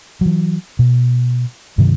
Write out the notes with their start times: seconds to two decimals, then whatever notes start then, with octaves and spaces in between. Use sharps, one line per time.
0.21 E3 F#3
0.79 B2
1.78 G2 C3 D#3 F#3